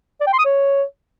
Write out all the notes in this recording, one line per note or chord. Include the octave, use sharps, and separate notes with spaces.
D5
G5
C6
D#6
C#5